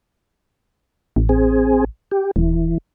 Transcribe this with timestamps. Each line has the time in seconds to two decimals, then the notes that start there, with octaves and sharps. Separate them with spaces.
1.16 A1
1.29 C4 G#4
2.11 G4
2.36 D#1 E3